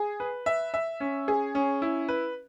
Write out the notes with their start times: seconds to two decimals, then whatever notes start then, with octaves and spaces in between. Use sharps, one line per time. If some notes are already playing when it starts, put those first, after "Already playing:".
Already playing: G#4
0.20 B4
0.46 E5
0.74 E5
1.00 C#4
1.28 G#4
1.55 C#4
1.82 E4
2.09 B4